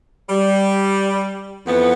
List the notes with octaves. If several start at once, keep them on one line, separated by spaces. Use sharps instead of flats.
G3
F2 E3 B3